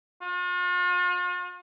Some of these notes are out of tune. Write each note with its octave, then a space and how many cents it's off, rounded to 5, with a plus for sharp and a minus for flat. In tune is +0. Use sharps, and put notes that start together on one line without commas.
F4 +45